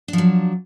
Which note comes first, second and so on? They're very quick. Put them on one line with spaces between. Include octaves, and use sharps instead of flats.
D4 F3 F#3